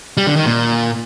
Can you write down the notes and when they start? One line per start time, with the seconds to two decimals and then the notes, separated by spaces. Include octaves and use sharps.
0.17 G3
0.27 D3
0.36 D#3
0.46 A#2